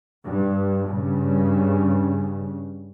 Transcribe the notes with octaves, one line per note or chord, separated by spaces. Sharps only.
G2
G2 C#3